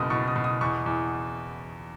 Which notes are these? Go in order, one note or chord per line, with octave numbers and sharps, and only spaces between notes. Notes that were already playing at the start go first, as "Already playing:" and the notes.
Already playing: F#1 B2 D#6
B2 C#6
D#6
B2
D#6
E2 C#6
E2